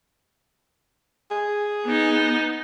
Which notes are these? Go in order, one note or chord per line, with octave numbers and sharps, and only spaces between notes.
G#4
B3 D#4